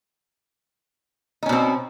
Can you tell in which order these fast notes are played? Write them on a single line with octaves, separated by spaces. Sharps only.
D#4 C#4 B2 C4